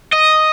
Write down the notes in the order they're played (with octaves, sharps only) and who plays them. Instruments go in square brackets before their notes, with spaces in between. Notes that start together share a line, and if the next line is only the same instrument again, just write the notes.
[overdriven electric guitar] D#5